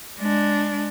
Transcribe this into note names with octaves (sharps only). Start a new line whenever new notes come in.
G#3 D4